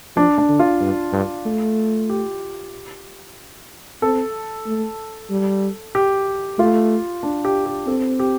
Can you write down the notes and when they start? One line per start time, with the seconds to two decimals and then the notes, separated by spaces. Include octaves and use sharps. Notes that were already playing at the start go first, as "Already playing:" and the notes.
0.16 F3 D4
0.38 D4
0.49 D3
0.59 F4
0.81 G2
1.13 G2
1.45 A3
2.10 G4
4.02 C4 A4
4.66 A3
5.30 G3
5.95 G4
6.58 A3 F4
7.23 D4
7.45 G4
7.66 G4
7.87 C4 A4
8.20 G4